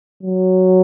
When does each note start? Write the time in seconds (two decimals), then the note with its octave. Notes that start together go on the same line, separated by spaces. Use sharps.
0.23 F#3